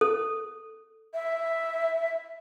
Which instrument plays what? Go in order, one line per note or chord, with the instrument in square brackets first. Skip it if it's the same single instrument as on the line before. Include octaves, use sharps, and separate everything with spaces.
[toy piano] A4
[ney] E5